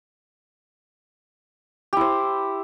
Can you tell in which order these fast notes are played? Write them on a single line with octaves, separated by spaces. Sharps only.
G4 E4 C5